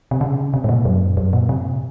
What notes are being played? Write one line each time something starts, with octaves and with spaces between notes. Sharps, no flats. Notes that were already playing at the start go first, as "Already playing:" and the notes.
C3
C#3
C3
G#2
A#2
F#2
F#2
A#2
C3